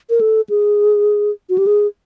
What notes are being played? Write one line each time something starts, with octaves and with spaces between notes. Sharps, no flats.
A#4
A4
G#4
F#4
G4
G#4